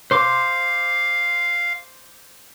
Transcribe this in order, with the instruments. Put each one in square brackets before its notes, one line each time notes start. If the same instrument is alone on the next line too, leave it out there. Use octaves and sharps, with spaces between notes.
[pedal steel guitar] C5 C6 D6 [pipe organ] F5